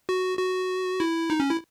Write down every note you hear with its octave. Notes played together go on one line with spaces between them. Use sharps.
F#4
F#4
E4
D#4
C#4
E4